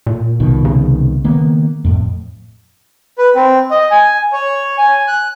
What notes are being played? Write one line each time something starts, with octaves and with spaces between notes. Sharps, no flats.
A#2
C2 B2 D#3
C#3
D#3 A#3 B3
F2 A2
B4
C4
D#5
G#5
C#5
G#5
F#6